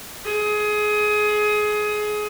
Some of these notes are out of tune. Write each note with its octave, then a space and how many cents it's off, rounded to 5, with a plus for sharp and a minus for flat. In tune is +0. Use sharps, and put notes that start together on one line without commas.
G#4 +20